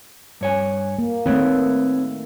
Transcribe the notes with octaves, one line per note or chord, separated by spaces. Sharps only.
G2 C#5 G#5
A#3
D#3 A3 C4 B4 C#5